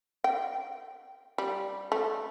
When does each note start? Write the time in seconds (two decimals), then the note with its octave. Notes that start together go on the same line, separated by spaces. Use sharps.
0.24 G5
1.38 G3
1.92 A3